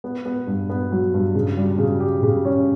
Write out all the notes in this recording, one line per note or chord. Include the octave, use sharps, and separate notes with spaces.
B3
B3
G2
B3
F#3
G2
C#3
G3
C#3
G4
C#3
C#4